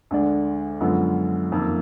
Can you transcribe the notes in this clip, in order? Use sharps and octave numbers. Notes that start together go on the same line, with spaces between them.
D2 D3 G#3 D4
F#2 D3 F3 G#3 B3
F#1 F2 D#3 A#3